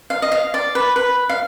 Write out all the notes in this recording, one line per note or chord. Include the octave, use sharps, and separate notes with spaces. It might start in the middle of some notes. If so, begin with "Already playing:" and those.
F5
D#5
F5
D5
B4
B4
F5